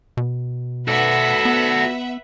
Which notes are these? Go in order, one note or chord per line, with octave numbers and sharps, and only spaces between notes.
B2
F#4 A4 B4 D5 E5 F#5
B3